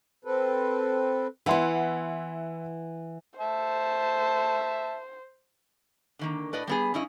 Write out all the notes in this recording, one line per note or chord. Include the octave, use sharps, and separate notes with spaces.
C4 A4 B4
E3 B3 E4 F#5 C6
C5 E5 A5
D3 D#3 A#3
A2 B4 D5 D#5
G3 B3 G#4
G2 C#4 E4 D#5